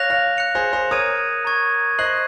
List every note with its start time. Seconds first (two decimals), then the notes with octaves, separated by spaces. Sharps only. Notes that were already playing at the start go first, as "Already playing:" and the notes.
Already playing: C#5 F5 F#6 A#6 F7
0.10 C#5 F5
0.37 F#6 C#7 F7
0.55 G#4 C5
0.73 G#4 C5
0.91 A#4 C#5 D#6 G#6 D#7
1.45 A#5 C#6 G#6
1.99 C5 D#5 F#6 C7 F#7